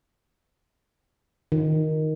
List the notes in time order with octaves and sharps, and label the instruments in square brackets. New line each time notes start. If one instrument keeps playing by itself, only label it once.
[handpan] D#3